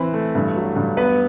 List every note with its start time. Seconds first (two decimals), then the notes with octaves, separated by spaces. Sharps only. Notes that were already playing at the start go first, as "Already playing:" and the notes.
Already playing: E3 C4 B4 B5
0.14 A3
0.35 G2
0.56 F#3
0.76 G2
0.97 B3 B4 B5